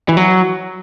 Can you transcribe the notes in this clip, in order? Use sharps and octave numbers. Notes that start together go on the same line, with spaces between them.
E3
F#3